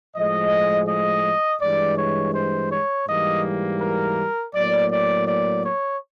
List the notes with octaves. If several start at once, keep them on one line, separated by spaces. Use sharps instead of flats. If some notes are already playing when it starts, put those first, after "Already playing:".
A2 F3 G#3 D#5
D#5
G2 E3 G#3 D5
C#5
C5
C#5
G#2 E3 G3 A#3 D#5
A#4
A2 F#3 A#3 D5
D5
D5
C#5